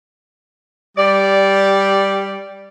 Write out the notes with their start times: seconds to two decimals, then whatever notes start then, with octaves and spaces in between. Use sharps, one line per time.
0.97 G3 D5